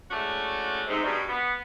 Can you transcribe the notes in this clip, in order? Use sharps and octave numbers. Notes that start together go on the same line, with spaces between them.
G#3 A3 C#4 D4 E4 F#4
G#2 C3
G2 B2 G3
B3